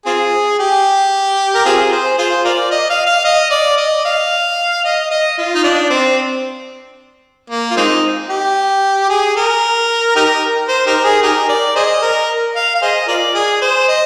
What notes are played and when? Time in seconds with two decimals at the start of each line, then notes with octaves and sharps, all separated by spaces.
0.06 C4 F4 G#4
0.59 G4
1.55 A#4
1.65 C4 F4 G#4
1.92 C5
2.18 F4 G#4 C5
2.45 F4 A#4 D5
2.71 D#5
2.90 F5
3.06 F5
3.24 D#5
3.51 D5
3.77 D#5
4.05 F5
4.85 D#5
5.11 D#5
5.38 F4
5.55 D#4
5.63 D4
5.90 C4
7.50 A#3
7.71 F4
7.77 G#3 C4 D#4
8.29 G4
9.09 G#4
9.36 A#4
10.16 D#4 G4 A#4
10.68 C5
10.86 D#4 G4 A#4
11.04 G#4
11.22 D#4 G4 A#4
11.49 D5
11.76 G#4 C5 D#5
12.02 A#4
12.56 F5
12.75 F5
12.82 G#4 C5 D#5
13.08 F4 A#4 D5
13.35 G#4
13.61 C5
13.88 D#5